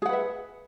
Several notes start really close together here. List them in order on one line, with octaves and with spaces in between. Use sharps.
G#4 F#5 B4 E5